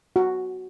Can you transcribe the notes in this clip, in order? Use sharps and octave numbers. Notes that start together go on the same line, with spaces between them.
F#4